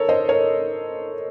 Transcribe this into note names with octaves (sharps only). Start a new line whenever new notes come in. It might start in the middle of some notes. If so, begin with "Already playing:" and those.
Already playing: A4 A#4 C#5
C5 D#5
A#4 C#5